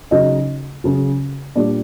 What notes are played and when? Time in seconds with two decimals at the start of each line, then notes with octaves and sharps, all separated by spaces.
0.11 C#3 F#3 D#4 D#5
0.84 C#3 F#3
1.55 A#2 G3 D4 D5